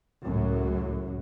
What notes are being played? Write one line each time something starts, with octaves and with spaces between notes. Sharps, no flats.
C#2 F#2 A2 F#3